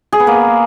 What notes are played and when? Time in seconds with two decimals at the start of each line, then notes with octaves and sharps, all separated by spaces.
0.12 G#4
0.20 B3
0.27 A#3